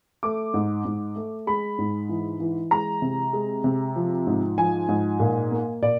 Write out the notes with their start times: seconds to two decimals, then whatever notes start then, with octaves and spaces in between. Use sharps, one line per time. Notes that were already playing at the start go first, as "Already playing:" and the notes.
0.23 A3 D6
0.54 G#2
0.85 G#2
1.16 A3
1.47 G#3 B5
1.78 G#2
2.09 E3
2.40 E3
2.71 G#3 A#5
3.02 C3
3.33 G#3
3.64 C3
3.96 F3
4.27 G#2
4.58 F3 G#5
4.89 G#2
5.20 A#2
5.51 A#3
5.82 A#2 D5